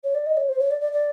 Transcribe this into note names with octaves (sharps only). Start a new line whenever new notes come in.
C#5
D5
D#5
C#5
C5
C#5
D5
D5
D5